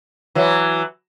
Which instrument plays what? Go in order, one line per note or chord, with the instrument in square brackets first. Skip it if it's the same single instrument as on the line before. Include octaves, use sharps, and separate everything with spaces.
[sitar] E3 F#3